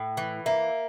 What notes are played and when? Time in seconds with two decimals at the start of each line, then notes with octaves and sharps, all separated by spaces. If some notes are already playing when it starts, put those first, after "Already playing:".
Already playing: A2
0.17 E3
0.46 A#3 E5